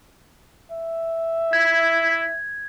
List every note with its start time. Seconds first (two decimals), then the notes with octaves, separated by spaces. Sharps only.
0.72 E5
1.53 E4 G#6